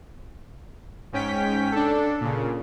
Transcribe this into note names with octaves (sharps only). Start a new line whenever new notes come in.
G#2 C#4 G5 B6
D4 A4
A#2 C#3